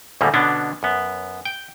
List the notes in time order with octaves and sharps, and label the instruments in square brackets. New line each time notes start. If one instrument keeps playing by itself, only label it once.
[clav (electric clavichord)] D2 A2 C#3 G3 A3 A#3
B2 D3 B3 C#4 D4
F#2 B3
G5